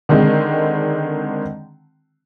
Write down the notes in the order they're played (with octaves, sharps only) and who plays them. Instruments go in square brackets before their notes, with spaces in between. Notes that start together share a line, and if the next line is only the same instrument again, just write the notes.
[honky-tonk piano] D3 D#3 G#3 C4